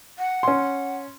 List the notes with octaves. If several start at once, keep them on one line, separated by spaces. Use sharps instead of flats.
F#5
C#4 C6